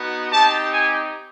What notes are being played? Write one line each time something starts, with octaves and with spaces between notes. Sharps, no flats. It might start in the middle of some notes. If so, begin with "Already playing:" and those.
Already playing: B3 D#4 F#4
C4 D#4 G4 A5
G#5